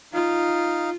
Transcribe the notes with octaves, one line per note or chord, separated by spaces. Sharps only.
D#4 F4 F5